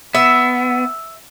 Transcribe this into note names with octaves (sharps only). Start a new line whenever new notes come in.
B3 E5